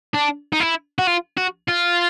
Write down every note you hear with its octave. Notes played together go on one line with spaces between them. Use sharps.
D4
D#4
E4
F#4
F4
F#4
F4